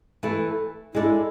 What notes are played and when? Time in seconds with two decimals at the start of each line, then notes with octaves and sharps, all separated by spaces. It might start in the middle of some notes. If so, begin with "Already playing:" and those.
0.23 E3 A3 E4 A4
0.94 G#3 D4 E4 A4